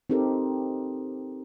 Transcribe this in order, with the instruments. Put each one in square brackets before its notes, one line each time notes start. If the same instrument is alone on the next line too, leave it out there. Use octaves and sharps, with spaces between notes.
[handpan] C4 D#4 G4 A4 A#4